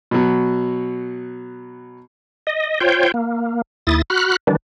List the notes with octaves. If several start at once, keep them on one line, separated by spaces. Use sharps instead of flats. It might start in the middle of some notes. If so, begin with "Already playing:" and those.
B2 F#3
D#5
F4 C5 C#5 G5
A#3
D#2 E4 D#6 A6
F#4 B5 F6 F#6
D#3 E3 G3 D4